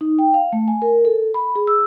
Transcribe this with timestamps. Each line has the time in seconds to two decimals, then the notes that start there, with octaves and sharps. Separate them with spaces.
0.01 D#4
0.19 G5
0.34 F5
0.53 A3
0.68 G#5
0.82 A#4
1.05 A4
1.34 B5
1.56 G#4
1.67 E6